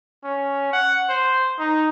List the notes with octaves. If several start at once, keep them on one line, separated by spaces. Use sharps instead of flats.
C#4
F#5
C5
D#4